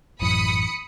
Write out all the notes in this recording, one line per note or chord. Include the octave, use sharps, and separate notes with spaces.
A1 F#2 E3 B5 D#6 C#7